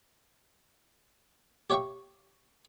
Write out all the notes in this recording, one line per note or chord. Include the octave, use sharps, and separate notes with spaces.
G4 C#5 E5 F5 G5 C#6